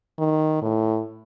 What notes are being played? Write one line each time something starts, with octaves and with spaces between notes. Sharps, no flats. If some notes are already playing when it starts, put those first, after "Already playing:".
D#3
A2